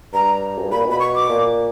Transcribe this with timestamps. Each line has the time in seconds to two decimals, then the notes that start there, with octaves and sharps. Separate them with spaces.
0.13 G2 A#5
0.58 F#2
0.64 G2
0.72 A#2 B5
0.86 B2
0.91 B5
1.00 C#6
1.15 D6
1.29 A#2